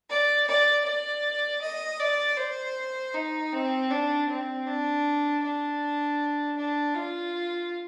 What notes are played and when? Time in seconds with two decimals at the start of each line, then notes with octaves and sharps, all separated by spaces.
0.10 D5
0.47 D5
0.85 D5
1.62 D#5
2.00 D5
2.38 C5
3.15 D#4
3.53 C4
3.91 D4
4.29 C4
4.67 D4
5.43 D4
6.57 D4
6.95 F4